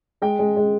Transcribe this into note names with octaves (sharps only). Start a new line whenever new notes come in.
G#3 G5
G#3
G#3